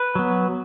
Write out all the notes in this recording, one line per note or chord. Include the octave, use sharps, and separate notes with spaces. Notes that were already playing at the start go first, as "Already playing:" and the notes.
Already playing: B4
F#3 B3